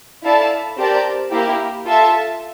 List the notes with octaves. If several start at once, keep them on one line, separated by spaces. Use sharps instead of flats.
E4 A4 D5 F5 A5
C4 G4 A#4 D5 A5
A#3 E4 G4
F4 A4 E5 A5